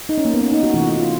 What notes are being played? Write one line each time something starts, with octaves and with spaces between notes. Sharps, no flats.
D#4
C#4
A#3
B3
C#4
D#4
F#4
C3 E3 A3 F#4
F4
F#4
F4